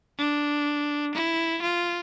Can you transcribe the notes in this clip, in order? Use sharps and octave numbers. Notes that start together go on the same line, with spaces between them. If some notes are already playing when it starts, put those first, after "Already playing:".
D4
E4
F4